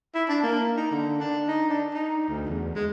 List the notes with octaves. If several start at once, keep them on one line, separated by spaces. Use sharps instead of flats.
E4
D4
A#3
D#4
D3
D4
D#4
D4
D#4
D2
E2
G#3